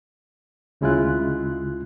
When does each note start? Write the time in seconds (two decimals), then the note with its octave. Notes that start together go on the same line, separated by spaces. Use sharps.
0.81 D2 C#3 G#3 E4 F4 F#6